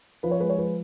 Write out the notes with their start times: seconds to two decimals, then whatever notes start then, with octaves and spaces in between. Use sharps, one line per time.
0.23 F3 B4
0.31 C#5
0.40 G#3 B4
0.50 C#5
0.58 F3 B4